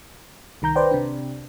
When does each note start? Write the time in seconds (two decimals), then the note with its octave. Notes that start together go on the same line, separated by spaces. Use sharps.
0.62 C2 D#3 A#5 G6
0.75 B4 C5 D5 G5
0.91 C3 D4